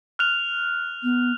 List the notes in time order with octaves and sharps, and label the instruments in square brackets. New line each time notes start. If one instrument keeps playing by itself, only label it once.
[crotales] F6 F#6 F7
[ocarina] B3